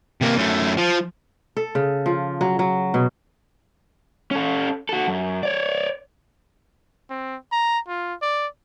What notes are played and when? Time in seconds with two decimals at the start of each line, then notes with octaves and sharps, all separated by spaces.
0.21 C3 A#3
0.37 F#2 A3
0.78 F3
1.57 A4
1.75 C#3
2.06 F3
2.41 F#3
2.59 F#3
2.94 B2
4.31 C#4 A4
4.89 F#4 A4
5.08 F#2
5.43 C#5 D5
7.10 C4
7.52 A#5
7.88 F4
8.22 D5